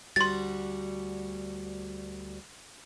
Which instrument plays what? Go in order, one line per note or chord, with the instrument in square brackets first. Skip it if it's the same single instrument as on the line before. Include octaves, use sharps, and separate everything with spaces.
[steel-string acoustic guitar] D2 G3 F#4 [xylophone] C6 A6